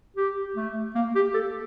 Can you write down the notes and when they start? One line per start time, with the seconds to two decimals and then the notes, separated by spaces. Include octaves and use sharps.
0.17 G4
0.56 A3
0.95 A#3
1.15 G4
1.34 A4